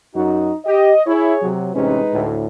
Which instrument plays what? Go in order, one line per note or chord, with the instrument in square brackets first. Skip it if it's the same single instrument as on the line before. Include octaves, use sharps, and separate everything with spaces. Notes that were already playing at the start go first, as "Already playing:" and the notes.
[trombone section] F#2 F#4 [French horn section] D#4
[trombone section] G4 [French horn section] D#5
[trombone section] E4 [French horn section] G#4 C#5
[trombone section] C3 F#3
[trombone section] A1 C3 C#4 [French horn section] G#3 D#4 B4
[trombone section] D2 A2